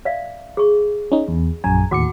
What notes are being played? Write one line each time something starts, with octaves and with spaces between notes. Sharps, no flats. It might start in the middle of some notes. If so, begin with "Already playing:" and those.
D5 E5 F5
G#4 C#6
C#4 D#4
E2
A#1 F#2 G#5 A#5
D#2 A2 F#4 F#5 D6 C#7